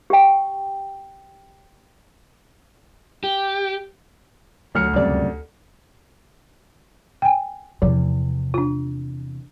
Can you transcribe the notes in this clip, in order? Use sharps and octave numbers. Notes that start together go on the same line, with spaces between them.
G4 G5
G4
D2 F#3 F6 C#7
C#2 F#2 C3 G3 D5
G5 G#5
E2 C3 F3
D4 F4